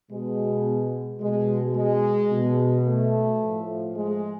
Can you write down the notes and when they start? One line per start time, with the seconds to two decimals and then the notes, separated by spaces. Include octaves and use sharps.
0.12 B2 G#3
1.21 B2 G#3
1.76 G#3
2.31 B2
2.86 A3
3.41 A2 F3
3.95 G#3